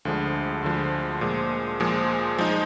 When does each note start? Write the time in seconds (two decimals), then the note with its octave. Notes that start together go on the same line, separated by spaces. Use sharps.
0.05 D2 D3 F3 G#3
0.63 D2 D3 F3 G#3
1.21 A#2 F3 G#3
1.80 A#2 F3 G#3
2.38 F3 G#3 D#4